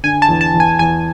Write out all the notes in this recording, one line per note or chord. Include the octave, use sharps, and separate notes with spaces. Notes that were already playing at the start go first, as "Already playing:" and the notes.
D3 G#5
A5
E2
A5
E2
G#5
E2 G#5